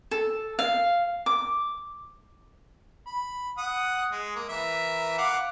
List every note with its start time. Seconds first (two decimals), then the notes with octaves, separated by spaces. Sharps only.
0.11 A4
0.59 F5
1.26 D6
3.07 B5
3.58 F#5 D#6
4.11 G#3
4.36 A#3
4.49 E3 A#4 E5
5.18 F5 F#5 D6